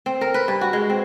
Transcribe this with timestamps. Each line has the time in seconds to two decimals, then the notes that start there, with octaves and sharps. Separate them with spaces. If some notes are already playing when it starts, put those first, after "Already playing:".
0.06 C4
0.21 A#4
0.34 B4
0.48 G2
0.61 F#4
0.73 G#3
0.90 C4